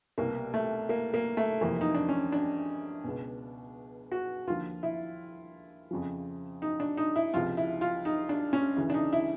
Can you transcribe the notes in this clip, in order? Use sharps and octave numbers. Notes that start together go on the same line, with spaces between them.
C2 B2 A#3
A3
A#3
A#3
A3
F2 C3 E3 A#3
D#4
D4
C#4
D4
C#2 B2
F#4
D#2 D3 F3 F4
E4
F2 C#3 F3
D#4
D4
D#4
E4
C#2 C3 F3 F4
E4
F4
D#4
D4
C#4
D2 C#3 E3
D4
D#4
E4